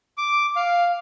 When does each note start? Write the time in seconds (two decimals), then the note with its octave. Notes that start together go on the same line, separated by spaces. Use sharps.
0.18 D6
0.56 F5